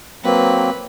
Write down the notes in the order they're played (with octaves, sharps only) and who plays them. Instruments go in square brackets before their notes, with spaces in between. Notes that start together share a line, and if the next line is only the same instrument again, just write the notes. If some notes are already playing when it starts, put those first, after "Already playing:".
[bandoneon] F#3 A#3 C4 [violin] B4